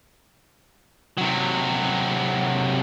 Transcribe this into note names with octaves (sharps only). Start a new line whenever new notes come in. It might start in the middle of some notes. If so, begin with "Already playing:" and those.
C3 F#3